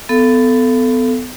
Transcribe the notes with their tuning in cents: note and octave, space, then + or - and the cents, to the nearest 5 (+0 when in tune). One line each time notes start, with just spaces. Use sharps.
B3 +25 A4 +0 F5 -25